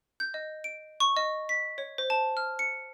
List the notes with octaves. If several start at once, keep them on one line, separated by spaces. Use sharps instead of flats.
G6
D#5
D7
C#6
D#5
B6
C#5
C5
A5
F6
C#7